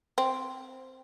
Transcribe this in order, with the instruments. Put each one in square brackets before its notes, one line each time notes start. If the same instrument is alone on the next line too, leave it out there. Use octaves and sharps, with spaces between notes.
[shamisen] C4